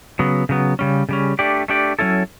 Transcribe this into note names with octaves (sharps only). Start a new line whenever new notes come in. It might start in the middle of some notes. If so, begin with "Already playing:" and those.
C#3 F#3 B3
C#3 F#3 B3
C#3 G3 C#4
C#3 G3 C#4
A3 D4 G4 D5
A3 D4 G4 D5
F#3 C#4 E4 A4